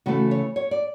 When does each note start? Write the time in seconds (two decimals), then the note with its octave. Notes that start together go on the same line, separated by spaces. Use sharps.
0.06 C#3 E3 A3 F#4
0.31 C#5
0.56 C#5
0.71 D5